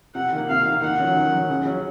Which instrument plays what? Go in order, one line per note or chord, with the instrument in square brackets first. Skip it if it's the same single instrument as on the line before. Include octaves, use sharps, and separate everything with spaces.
[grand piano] C3 [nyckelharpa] F#5
[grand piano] D#3 A#3
[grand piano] C3 [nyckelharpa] F5
[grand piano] D#3 A#3
[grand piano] D#3 [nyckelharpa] F#5
[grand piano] F#3 C#4
D#3
F#3 C#4
C#3
F#3 C#4